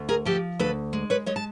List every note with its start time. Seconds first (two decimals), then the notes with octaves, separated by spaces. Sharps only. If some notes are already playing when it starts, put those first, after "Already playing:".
Already playing: D2
0.09 G#4 A#4
0.25 F3 G4 A4
0.59 D2 A4 B4
0.93 G#3
1.10 B4 C#5
1.26 G#3 C#5 D#5
1.36 A5